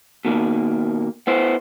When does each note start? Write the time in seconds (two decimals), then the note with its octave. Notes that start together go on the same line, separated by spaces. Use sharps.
0.25 B2 D#3 A#3
1.27 B3 E4 C5